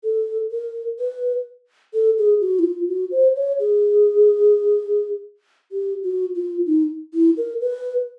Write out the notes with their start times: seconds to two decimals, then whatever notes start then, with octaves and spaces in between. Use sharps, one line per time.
0.04 A4
0.51 A#4
0.99 B4
1.94 A4
2.18 G#4
2.41 F#4
2.59 E4
2.64 F4
2.88 F#4
3.11 C5
3.36 C#5
3.59 G#4
5.72 G4
6.03 F#4
6.35 F4
6.66 D#4
7.14 E4
7.37 A#4
7.61 B4